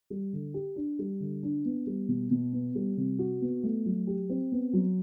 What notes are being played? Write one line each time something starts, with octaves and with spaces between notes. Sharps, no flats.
G3
D3
G4
D4
G3
D3
D4
B3
G3
B2
B2
B3
G3
C3
F#4
B3
A3
F#3
G4
C4
B3
F#3